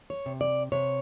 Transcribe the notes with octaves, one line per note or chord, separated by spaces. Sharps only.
C#5
C3
D5
C3 C#5